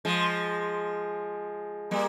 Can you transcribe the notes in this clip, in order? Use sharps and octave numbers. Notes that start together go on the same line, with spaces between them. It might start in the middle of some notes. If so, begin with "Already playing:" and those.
F3 G#3
G3 A#3